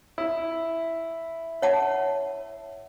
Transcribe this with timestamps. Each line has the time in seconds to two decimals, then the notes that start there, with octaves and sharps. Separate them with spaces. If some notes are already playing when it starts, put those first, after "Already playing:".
0.18 E4
1.62 C#5 F#5 A5